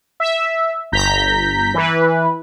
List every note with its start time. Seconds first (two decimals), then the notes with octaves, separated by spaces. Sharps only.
0.20 E5
0.92 G1 A#5 G6 B6
1.74 E3 B4